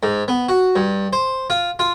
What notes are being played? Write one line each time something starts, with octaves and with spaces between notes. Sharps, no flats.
G#2
B3
F#4
G2
C5
F4
F4